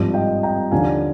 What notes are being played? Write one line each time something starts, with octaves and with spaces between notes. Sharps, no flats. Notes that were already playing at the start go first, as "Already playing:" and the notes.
Already playing: G#1 G2 F3
D#5 G5
G5 A#5
D#2 D3 F3 F5 G#5